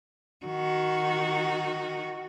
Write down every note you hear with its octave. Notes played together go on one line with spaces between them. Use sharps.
D#3 F#4